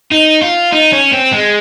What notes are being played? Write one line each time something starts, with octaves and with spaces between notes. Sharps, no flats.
D#4
F4
D#4
C#4
C4
G#3